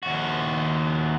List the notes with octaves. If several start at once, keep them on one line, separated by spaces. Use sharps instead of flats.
D#2 F#4